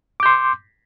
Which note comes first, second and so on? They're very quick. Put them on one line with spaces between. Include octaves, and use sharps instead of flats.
D6 G6 C6